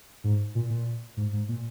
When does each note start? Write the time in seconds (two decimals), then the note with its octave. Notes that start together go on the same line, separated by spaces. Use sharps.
0.24 G#2
0.55 A#2
0.70 A#2
1.17 G#2
1.33 G#2
1.49 A#2